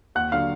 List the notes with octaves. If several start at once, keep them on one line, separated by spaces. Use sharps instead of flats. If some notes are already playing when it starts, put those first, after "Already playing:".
D#2 F#5 F#6
D3 F#3 F5 F6